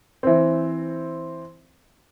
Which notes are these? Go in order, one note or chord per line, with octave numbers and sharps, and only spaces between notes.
E3 C4